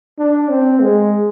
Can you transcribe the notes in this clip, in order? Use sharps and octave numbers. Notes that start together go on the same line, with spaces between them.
D4
C4
G#3